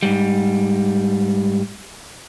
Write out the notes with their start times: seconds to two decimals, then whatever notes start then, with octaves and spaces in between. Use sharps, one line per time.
0.03 G#2 G3